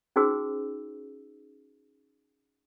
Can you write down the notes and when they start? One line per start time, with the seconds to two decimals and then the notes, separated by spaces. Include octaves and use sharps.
0.16 C#4 D#4 F#4 G#4 C5 E6